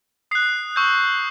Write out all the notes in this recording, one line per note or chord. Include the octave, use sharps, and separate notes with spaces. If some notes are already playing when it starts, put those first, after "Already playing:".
D#6 F#6 C7
C#6 E6 G6